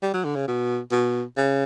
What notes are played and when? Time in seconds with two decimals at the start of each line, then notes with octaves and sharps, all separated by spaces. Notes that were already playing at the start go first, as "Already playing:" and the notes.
0.02 G3
0.14 F#3
0.24 D3
0.36 C#3
0.48 B2
0.92 B2
1.37 C#3